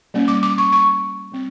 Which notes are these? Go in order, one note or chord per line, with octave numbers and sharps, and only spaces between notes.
G3 A#3 C#4
D6
D6
C#6
C#6
G3 C4